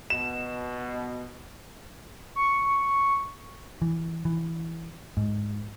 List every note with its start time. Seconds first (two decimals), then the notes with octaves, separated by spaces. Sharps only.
0.10 B2 E7
2.36 C#6
3.82 E3
4.25 E3
5.17 G#2